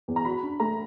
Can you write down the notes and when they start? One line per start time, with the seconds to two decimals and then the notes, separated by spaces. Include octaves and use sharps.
0.08 E2
0.16 A#5
0.25 F#4 B5
0.43 D4
0.60 A3 A#5